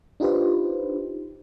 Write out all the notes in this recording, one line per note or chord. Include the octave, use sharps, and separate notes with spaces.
D4 D#4 F4 G4 B4 C5